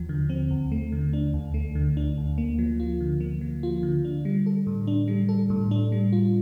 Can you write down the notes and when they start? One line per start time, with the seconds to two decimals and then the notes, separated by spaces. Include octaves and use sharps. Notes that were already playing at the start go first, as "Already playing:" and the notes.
Already playing: D#2 F3
0.09 D3
0.29 C4
0.50 D#2
0.72 A3
0.92 D3
1.13 D4
1.34 D2
1.54 A3
1.75 D3
1.97 D4
2.18 D2
2.38 A#3
2.59 F3
2.80 F4
3.01 D3
3.20 A#3
3.41 F3
3.63 F4
3.83 D3
4.05 D4
4.25 G3
4.46 A4
4.67 A2
4.87 D4
5.08 G3
5.29 A4
5.50 A2
5.71 D4
5.92 G3
6.12 F4